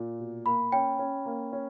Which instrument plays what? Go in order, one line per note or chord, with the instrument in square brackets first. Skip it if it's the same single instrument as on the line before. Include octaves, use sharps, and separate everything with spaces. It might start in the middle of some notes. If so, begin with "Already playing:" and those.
Already playing: [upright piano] A#2
B2
[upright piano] A#3 [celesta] B5
[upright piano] C#4 [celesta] G5
[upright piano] C#4
A#3
C#4